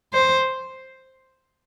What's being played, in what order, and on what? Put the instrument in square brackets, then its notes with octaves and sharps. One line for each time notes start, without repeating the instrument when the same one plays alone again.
[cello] C5